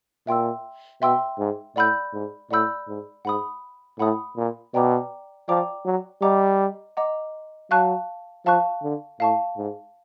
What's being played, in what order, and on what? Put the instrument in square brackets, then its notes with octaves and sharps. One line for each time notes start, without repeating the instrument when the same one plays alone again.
[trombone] A#2 [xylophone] E5 G5 C6 E6
[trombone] B2 [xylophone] E5 G5 C6 E6
[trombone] G#2
[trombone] A2 [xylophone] D5 F#5 B5 E6 G6
[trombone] G#2
[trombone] A2 [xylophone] D5 F#5 B5 E6 G6
[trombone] G#2
[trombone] G#2 [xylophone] F#5 B5 D#6
[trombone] A2 [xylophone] F#5 B5 D#6
[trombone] A#2
[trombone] B2 [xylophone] D5 G5 A#5 D6
[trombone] F3 [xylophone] D5 G5 A#5 D6
[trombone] F#3
[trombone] G3 [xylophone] D#5 F#5 A#5 D6
[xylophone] D#5 F#5 A#5 D6
[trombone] F#3 [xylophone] F5 A5 C#6 F#6
[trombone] F3 [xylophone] F5 A5 C#6 F#6
[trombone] D3
[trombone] A2 [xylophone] F5 A5 C#6
[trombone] G#2